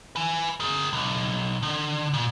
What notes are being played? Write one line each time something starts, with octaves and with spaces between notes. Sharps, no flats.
B4 G#5
G#4 A#4
B1
D3
A#2